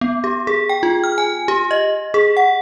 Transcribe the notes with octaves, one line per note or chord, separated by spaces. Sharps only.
B3
G4
G#4
G5
F4
F6
G#5
G4
D#5
G#4
F#5